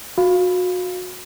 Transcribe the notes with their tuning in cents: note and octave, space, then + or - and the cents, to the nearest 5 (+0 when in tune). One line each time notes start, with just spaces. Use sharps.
F#4 -30 F5 +0